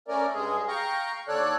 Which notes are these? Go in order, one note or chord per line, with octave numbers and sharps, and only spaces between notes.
A3 C#4 A#4 D5
G2 G#3 G#4
F5 G5 A#5 C#6
D#2 D3 A4 C#5 D5 F#6